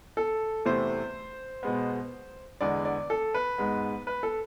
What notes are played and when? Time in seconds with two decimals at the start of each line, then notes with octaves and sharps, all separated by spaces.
0.17 A4
0.65 E2 C3 E3 A3 C5
1.63 B2 G#3 B3
2.61 E2 D3 G#3 B3 D5
2.85 D5
3.10 A4
3.34 B4
3.58 G#2 G#3 B3
4.07 B4
4.23 A4